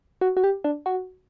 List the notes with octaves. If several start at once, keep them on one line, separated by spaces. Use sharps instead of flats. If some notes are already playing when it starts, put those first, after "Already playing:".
F#4
F#4
G4
D4
F#4